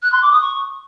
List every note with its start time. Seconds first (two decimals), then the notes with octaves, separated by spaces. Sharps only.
0.02 F#6
0.12 C6
0.21 D6
0.31 D#6
0.41 C#6